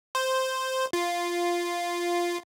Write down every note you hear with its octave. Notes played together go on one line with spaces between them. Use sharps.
C5
F4